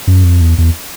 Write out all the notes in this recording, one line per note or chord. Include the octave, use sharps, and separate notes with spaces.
F#2
F2
E2
E2